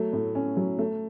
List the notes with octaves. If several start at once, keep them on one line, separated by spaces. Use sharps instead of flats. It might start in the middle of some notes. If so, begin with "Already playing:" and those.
Already playing: F#3 A3
A2
C#4
F#3
A3